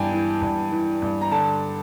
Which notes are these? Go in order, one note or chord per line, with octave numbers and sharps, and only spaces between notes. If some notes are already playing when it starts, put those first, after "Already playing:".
Already playing: G2 E3 G5 G#5
E3
G2
E3
G2
A#5
D3 A5